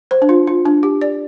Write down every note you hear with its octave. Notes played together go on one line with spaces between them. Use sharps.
C5
D4
F4
F4
D4
G4
D5